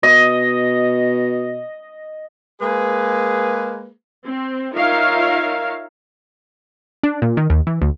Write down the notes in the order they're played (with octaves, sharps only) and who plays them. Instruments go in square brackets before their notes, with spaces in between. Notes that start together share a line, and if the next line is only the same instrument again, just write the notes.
[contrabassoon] B2 [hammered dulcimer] D#5
[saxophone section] G#3 A#3 G#4 B4
[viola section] C4
D#4 F4 A#4 C#5 E5 F5
[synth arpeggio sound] D4
A#2
D#3
D#2
E3
D2